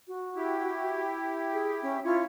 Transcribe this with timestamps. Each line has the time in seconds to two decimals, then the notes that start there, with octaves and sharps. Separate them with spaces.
0.08 F#4
0.36 E4 G4
1.53 G#4
1.82 C#4
2.04 C#4 E4 F4 C#5